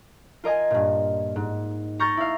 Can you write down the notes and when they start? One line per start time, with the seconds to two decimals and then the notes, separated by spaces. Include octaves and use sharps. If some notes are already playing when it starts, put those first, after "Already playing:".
0.44 F4 A#4 D#5 G#5
0.70 G2 A#2
1.36 G#2
1.99 A#5 C#6 F6 G6 A6 A#6
2.17 E4 F5